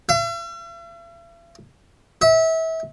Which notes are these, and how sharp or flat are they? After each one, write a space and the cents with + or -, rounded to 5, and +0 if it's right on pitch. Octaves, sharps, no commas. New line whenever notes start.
E5 +45
E5 -30